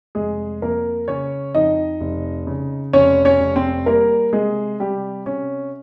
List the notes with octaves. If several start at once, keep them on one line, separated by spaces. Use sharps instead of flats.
F1 G#3 G#4
F2 A#3 A#4
C#3 C#4 C#5
F2 D#4 D#5
F1
C#3
F1 C#4 C#5
C#4 C#5
F1
C4 C5
G3 A#3 A#4
C3 G#3 G#4
C3 G3 G4
C3 C#4